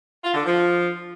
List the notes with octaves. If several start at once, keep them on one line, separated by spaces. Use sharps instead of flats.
F4
D3
F3